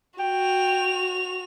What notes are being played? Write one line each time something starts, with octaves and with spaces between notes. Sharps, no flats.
F#4 G5 F7